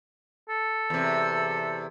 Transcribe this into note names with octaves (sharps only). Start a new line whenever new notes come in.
A4
E2 C3